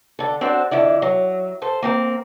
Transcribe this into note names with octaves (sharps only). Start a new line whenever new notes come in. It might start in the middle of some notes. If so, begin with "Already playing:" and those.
D3 A4
C4 D4 F#4 C5
F2 D3 E4 D5
F#3
A4 C5
A#3 C4 A#4